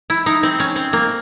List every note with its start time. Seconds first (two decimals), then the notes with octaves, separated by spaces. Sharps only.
0.10 E4
0.26 D#4
0.43 C4
0.60 C#4
0.76 C4
0.93 A#3